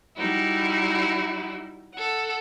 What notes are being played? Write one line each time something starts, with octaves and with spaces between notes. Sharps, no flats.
G3 D#4 E4 F#4
A4 F#5